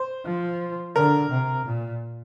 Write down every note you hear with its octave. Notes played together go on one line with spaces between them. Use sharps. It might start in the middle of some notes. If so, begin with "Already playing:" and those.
Already playing: C5
F3
D3 A#4
C3
A#2